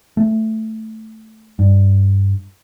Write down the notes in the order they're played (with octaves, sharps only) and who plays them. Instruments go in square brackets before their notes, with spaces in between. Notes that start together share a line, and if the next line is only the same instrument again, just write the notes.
[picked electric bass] A3
G2